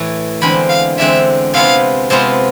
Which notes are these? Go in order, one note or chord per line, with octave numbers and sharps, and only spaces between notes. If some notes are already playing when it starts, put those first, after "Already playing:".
Already playing: A2 E3 A3
E2 D3 G#3 C4 B5
F5
E2 D3 G#3 C4 E5
C3 G#3 B3 F4 F5
C3 G#3 B3 F4 C5